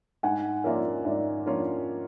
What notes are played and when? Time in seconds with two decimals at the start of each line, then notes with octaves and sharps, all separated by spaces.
0.23 G#2 F#5 G#5
0.64 F3 A#3 C#4 F4 D5 E5
1.05 G#2 D5 E5
1.46 F3 A#3 C#4 F4